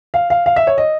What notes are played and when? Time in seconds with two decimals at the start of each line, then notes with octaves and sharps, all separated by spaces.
0.14 F5
0.30 F5
0.46 F5
0.56 E5
0.67 C#5
0.78 D#5